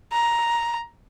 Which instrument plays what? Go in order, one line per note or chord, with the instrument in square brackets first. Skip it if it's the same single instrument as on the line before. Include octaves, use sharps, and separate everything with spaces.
[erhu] A#5